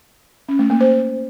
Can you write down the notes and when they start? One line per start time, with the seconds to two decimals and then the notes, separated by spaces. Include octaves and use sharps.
0.49 C#4
0.59 A3
0.70 A#3
0.81 C5